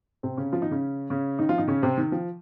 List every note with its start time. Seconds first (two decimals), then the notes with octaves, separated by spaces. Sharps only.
0.23 C3 C4
0.37 C#3 C#4
0.52 F3 F4
0.62 D#3 D#4
0.71 C#3 C#4
1.10 C#3 C#4
1.39 D#3 D#4
1.49 F3 F4
1.58 D#3 D#4
1.68 C#3 C#4
1.83 C3 C4
1.98 D#3
2.12 F3